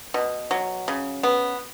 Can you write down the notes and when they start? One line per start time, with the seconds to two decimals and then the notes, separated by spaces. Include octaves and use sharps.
0.14 B2
0.51 F#3
0.88 C#3
1.23 B3